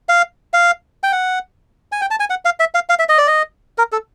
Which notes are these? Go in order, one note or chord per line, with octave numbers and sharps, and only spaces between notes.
F5
F5
G5
F#5
G#5
G5
A5
G#5
F#5
F5
E5
F5
F5
E5
D#5
D5
D#5
A#4
A4